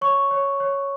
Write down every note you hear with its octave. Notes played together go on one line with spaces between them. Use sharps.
C#5 C#6
C#5
C#5